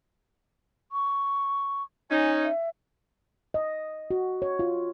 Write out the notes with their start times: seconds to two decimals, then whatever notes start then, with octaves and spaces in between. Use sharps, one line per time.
0.92 C#6
2.11 C#4 D#4 G#5
2.44 E5
3.54 D#5
4.11 F#4
4.42 C#5
4.59 F4